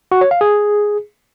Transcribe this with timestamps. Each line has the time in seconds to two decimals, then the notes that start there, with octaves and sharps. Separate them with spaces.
0.12 F#4
0.21 C#5
0.31 F5
0.41 G#4